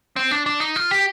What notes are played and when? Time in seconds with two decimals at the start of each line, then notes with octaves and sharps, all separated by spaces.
0.16 C4
0.31 D4
0.46 D4
0.60 D#4
0.76 F4
0.91 G4